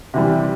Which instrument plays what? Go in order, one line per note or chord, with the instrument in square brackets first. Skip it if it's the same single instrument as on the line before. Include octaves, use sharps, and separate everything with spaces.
[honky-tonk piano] C3 E3 G3